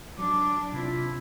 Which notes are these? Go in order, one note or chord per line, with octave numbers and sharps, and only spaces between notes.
F#3 D4 D6
C3 C4 E4 F4